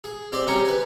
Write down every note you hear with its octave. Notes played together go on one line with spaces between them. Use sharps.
G#4
C4 G4 C5 D5
C#3 G3 C#4 G4 C#5 A#5
B4 G#5